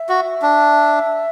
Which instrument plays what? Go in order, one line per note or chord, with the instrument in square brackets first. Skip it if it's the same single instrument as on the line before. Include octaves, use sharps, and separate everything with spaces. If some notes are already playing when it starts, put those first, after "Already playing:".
Already playing: [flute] E5
[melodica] F#4
D4